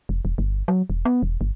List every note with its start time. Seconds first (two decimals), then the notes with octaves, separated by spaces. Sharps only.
0.09 F1
0.25 E1
0.38 G1
0.68 F#3
0.90 E1
1.05 B3
1.23 E1
1.41 G1